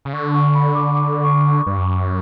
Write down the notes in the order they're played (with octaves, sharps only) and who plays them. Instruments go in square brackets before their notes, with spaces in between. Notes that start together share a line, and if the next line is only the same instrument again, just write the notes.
[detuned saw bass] C#3
[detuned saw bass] D3 [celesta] C#6
[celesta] C#6
B5
D6
D6
C#6
C#6
[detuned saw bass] G2
F#2